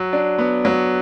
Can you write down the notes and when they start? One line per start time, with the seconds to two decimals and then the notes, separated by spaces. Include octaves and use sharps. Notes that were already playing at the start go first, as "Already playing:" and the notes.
Already playing: F#3
0.13 D4
0.38 B3
0.65 F#3